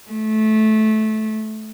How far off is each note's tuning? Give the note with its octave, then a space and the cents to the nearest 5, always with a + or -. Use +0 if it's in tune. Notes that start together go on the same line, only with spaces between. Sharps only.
A3 -15